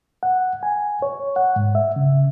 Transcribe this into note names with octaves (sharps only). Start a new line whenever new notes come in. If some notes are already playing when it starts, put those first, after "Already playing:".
F#5
G#5
C#5
F#5
G#2
E5
C#3